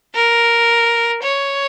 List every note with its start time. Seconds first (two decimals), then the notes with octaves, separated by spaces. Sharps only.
0.15 A#4
1.22 C#5